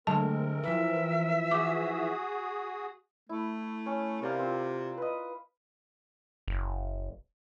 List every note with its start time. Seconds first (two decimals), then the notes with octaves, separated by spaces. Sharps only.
0.07 D3 F#3 G#3 A3 C4 A#4 A5
0.64 E3 F3 E5
1.51 F#4 G#4 D6 D#6
3.29 A3 E4
3.86 C#4
4.22 C3 A#3 D5 F5
4.39 C4 F4
4.98 B4 D#5
6.48 F#1